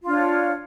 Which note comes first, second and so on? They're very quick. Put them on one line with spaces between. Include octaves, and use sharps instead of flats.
F4 D4 C#5